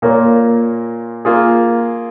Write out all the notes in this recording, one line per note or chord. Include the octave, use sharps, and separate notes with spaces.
A#2 A#3 F4 A#4 C#5
A#3 F4 G#4